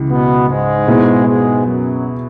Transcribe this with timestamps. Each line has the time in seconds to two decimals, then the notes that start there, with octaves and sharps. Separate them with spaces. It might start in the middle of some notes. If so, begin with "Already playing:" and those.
Already playing: C#2 C#3 E3
0.09 B2 B3
0.48 G#2 G#3
0.87 B2 B3 E4 G#4
1.26 G#2 G#3
1.65 F#2 F#3